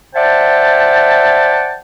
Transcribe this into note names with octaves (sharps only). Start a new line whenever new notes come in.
C5 D5 E5 F#5 G5 A5